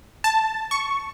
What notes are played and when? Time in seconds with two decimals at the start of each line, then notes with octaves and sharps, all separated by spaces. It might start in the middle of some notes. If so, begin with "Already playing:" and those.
0.24 A5
0.71 C#6